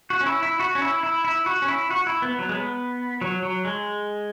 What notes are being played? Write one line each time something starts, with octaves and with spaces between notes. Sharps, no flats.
F#4
C#4
E4
E4
F#4
C#4
E4
E4
E4
F#4
C#4
E4
F#4
E4
B3
F#3
G#3
B3
F#3
F#3
G#3